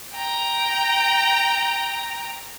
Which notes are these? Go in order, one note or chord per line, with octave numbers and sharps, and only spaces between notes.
G5 A#5